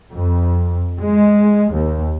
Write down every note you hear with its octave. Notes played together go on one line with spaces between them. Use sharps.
F2
G#3
D#2